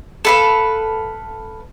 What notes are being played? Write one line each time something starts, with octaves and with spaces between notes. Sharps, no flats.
A4 B4 F5